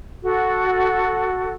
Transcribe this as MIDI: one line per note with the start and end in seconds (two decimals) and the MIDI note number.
0.23 1.52 66
0.23 1.52 69